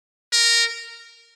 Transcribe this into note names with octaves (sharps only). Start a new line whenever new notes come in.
A#4